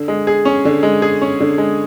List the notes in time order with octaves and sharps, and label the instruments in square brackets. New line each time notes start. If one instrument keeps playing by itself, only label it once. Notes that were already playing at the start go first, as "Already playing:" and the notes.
Already playing: [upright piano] D3
G#3
G#4
C#4
D3
G#3
G#4
C#4
D3
G#3